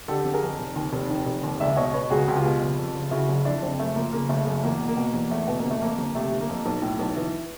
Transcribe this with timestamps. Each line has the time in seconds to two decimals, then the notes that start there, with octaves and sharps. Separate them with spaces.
0.08 D3 G4 A4
0.25 G1
0.33 G#4 A#4
0.41 F2
0.59 F1
0.76 D#2
0.93 F1
1.10 D#3
1.27 F1
1.43 D#2
1.60 C#2 D5 E5
1.76 B2 C#5 D#5
1.93 B2 B4 C#5
2.10 C#2 F#4 G#4
2.28 C#2
2.36 F4 G4
2.44 B2
2.61 F#1
2.78 F2
2.95 F#1
3.11 C#3 E4 F#4
3.28 F#1
3.45 F2 D4 E4
3.62 F#1 C4 D4
3.79 F#2 A3
3.96 F3 A#3
4.13 C#3 A#3
4.29 F#1 A3
4.46 F#2 A3
4.64 E2 A#3
4.80 B2
4.88 A#3
4.97 B2
5.14 E2 A#3
5.30 E2 A3
5.47 B2 B3
5.60 A#3
5.65 G1
5.71 A3
5.82 F2 A#3
5.98 G1
6.15 C3 A3
6.33 G1
6.41 A#3
6.49 F2
6.66 B1
6.82 A2
6.99 B1
7.16 E3